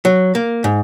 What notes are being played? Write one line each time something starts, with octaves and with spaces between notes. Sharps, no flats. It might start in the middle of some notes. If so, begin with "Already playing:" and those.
F#3
A#3
G#2